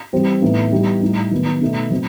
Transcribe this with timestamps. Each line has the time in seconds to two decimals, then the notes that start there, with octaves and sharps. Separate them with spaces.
0.12 E3 G3 C4
0.41 A2 E3 B3 D#4
0.72 E3 G3 B3 D#4
1.02 A2 G3 D#4
1.31 D#3 F#3 B3
1.61 B2 A3 D#4
1.91 F#3 C4